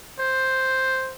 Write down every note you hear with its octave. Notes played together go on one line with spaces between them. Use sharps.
C5